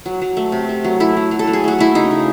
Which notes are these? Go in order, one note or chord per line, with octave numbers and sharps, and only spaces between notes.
F#3
F#3
A3
C3
A3
F#3
A3 E4
F#3
F#3
A4
F#3
G#4
A3 F#4
A3 E4
C#3 D#4
C#3